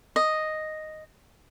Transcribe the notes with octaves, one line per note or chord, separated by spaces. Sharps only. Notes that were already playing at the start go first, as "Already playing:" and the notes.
D#5